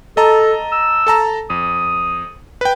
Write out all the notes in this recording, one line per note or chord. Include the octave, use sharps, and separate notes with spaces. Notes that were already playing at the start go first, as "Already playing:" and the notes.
A4 D#5 A5 A#5
E6
A4 A5 A#5
F2 D#6
B4 G5